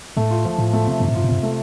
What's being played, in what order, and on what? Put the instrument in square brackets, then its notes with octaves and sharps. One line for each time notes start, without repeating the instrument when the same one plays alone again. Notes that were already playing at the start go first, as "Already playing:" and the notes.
[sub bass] A2 [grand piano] A3
[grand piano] F4
F3
[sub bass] A2 [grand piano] F4
[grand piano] A3
C3
[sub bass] G2 [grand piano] C3
[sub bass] A2
[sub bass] G2 [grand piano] F4
[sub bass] A2
[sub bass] G2 [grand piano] C3
[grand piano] A3